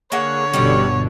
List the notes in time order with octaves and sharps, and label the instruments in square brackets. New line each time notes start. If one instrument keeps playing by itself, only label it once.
[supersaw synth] D3 [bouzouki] A#3 G#4 F#5 [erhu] C#5
[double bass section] G1 B2 [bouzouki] G3 C#4 D4